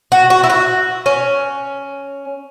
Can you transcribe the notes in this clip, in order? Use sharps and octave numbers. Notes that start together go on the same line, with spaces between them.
F#4
F#4
E4
F#4
C#4